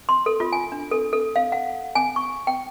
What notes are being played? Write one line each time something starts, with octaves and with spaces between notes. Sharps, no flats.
C6
A4
F4
G#5
D4
A4
A4
F5
F#5
G#5
C#6
G5